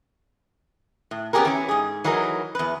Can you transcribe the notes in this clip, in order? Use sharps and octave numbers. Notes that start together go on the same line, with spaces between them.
A2
B3 C#4 D#4 G4 G#4 A#4
E3 C#4
G#2 G#4
E3 F#3 D#4 G#4 A#4
E2 B4